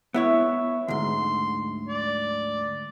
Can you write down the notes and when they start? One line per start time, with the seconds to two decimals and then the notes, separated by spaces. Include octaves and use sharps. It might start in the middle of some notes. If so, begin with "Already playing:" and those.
0.14 B3 E4 C#5 E5
0.88 D2 G#2 C6
1.88 D5